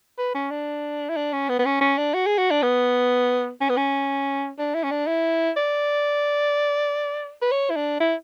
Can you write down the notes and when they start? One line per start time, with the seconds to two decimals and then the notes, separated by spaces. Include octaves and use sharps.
0.18 B4
0.35 C#4
0.51 D4
1.09 E4
1.16 D4
1.33 C#4
1.49 B3
1.59 B3
1.66 C#4
1.81 C#4
1.98 D4
2.14 F#4
2.26 G#4
2.38 F#4
2.51 D4
2.63 B3
3.61 C#4
3.69 B3
3.77 C#4
4.58 D4
4.75 E4
4.84 C#4
4.91 D4
5.07 E4
5.57 D5
7.42 B4
7.51 C#5
7.70 E4
7.76 D4
8.00 E4